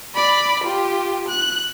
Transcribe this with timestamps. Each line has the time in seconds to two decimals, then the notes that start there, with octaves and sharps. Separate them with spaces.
0.15 D5 B5
0.64 F4 G4
1.29 F#6